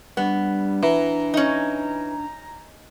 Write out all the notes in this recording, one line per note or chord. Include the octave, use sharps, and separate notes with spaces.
G3 B3 D4
E3 A#5
C#4 D#4